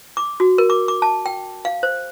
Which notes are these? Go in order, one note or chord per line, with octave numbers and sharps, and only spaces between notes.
D6
F#4
A#4
D6
D6
A5
G5
F5
C5